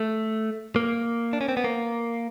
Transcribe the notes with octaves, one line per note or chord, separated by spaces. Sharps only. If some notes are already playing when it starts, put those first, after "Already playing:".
Already playing: A3
A#3
D4
C#4
C4
B3
A#3